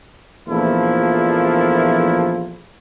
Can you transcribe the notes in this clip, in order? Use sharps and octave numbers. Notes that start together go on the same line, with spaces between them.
A#1 E2 F3 A3 A#3 E4